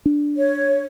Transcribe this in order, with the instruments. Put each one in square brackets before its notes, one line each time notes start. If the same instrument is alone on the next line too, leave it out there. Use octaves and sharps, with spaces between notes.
[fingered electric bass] D4
[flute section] C#5